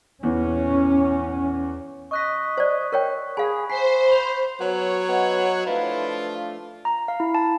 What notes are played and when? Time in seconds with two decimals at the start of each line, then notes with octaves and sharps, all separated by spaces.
0.23 E2 E3 C#4
2.11 D#5 C#6 F#6 B6
2.58 C5 D5
2.92 A#4 C#5 G5
3.37 G#4 F5 G#5 B5
3.70 C5 G#5 B6 C7
4.08 B5 C6 F7
4.60 F#3 B3 C#5
5.09 B3 D#5 F#5
5.66 F3 A3 D4 E4 F4 B4 E5 F5
6.85 A#5
7.08 F5
7.20 E4
7.35 A5